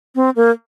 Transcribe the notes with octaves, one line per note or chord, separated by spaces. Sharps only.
C4
A#3